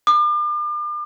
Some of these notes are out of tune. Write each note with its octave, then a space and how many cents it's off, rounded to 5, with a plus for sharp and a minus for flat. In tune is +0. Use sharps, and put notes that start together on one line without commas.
D6 +40